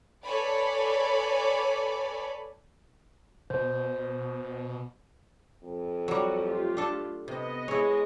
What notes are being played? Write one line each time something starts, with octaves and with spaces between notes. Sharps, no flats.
A4 B4 C#5 D5 G#5 B5
B2 C5
F2
F#3 G3 F#4
A3 F4 G4
D4 A4 A5
C3 B3 D#5
G#3 E4 C#5